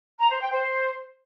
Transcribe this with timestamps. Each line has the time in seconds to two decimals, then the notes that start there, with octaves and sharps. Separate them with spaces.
0.19 A#5
0.30 C5
0.41 G5
0.52 C5